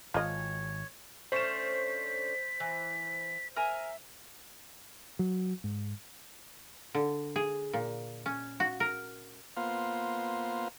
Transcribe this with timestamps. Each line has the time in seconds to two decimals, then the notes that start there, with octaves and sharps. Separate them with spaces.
0.14 G#1 F4 C#5 D#5
1.32 A3 C#4 D4 C5 B6 E7
2.60 E3
3.56 A#4 E5 G#5 A#5
5.19 F#3
5.64 G#2
6.95 D3
7.36 G#4
7.73 A#2
8.26 C#4
8.60 F#4
8.80 A#4
9.57 A#3 B3 F4 C5 F5